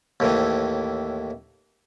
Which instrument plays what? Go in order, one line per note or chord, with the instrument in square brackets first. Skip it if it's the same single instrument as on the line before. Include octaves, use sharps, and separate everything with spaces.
[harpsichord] D#2 A2 E3